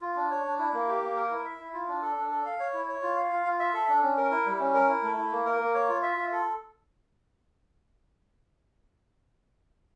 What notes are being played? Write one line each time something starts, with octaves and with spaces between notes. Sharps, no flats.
F4
D4
C#5
D4
E4
A#3
G4
A#3
A#4
E4
E5
E4
F4
D4
A4
D4
A4
F5
C#5
E4
C#5
F4
F5
F4
F4
E5
A4
D4
C#4
A#4
E4
G3
C#4
A#4
E4
A3
E4
A#3
A#4
A#3
C#5
F4
E5
F4
A4